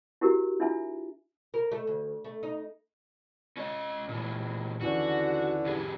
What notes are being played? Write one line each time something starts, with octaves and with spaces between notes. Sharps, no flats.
E4 F#4 G4 A#4
D4 E4 F4 E5 G#5
A#4
A3
D2
A3
D#4
C#4 C#5 D#5
A#2 E3
D#2 D3 E3 C#4 F#4
F2 G4 G#4